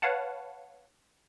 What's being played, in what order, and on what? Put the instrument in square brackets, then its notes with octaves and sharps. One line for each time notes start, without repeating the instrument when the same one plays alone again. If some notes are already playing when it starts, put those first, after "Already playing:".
[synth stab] B4 C#5 F5 F#5 A5